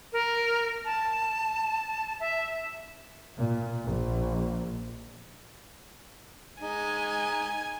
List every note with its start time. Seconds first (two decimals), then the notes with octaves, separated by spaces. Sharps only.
0.13 A#4
0.85 A5
2.20 E5
3.38 A#2
3.84 A#1
6.61 G#3 D#4 G#5